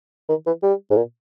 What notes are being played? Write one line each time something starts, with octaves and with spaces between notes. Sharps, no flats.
D#3
E3
G3
G#2
A#2